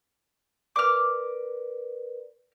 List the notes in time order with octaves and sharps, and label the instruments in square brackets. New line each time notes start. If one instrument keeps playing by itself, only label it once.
[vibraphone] A#4 B4 D5 [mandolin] D6 F6